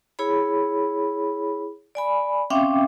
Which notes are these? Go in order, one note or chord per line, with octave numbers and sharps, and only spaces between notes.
E4 G#4 C#5 B5
D5 G#5 B5
C4 C#4 E5 F5 G5 D6